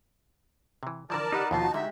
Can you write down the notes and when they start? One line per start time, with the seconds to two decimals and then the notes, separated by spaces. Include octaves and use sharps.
0.83 C3 E3
1.10 D3 E3 F3 A#4 D5 A5
1.32 D#4 G4 B4 F#5
1.51 D#2 B2 E3 F3 D#4 F4 F#4 A5
1.74 D3 G#3 G4 E5